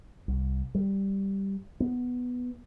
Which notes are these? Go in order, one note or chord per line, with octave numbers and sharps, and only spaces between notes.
C2
G3
B3